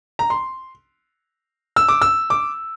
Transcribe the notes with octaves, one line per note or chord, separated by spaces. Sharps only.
A#5
C6
E6
D6
E6
D6